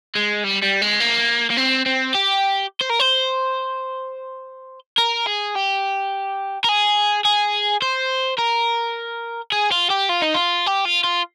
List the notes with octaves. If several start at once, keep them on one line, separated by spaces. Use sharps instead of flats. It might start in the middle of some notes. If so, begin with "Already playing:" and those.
G#3
G3
G3
G#3
A#3
A#3
C4
C4
G4
C5
A#4
C5
A#4
G#4
G4
A#4
G#4
G#4
C5
A#4
G#4
F4
G4
F4
D#4
F4
G4
F4
F4